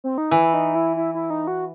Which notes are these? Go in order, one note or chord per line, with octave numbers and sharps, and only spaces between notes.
C4
D#4
E3 E4
D#4
E4
E4
E4
D#4
F#4